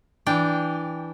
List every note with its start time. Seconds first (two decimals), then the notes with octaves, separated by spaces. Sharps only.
0.27 E3 D4 G5